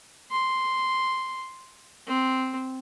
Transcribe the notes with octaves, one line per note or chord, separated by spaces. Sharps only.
C6
C4